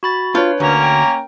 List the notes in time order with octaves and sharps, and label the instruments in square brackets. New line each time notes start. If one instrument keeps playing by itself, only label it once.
[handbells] F#4 B5 A6
[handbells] D4 B4 C#5 [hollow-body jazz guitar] F4
[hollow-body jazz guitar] D2 [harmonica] A#3 C#4 A#4
[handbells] G5